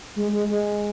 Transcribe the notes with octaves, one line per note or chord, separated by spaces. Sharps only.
G#3
G#3
G#3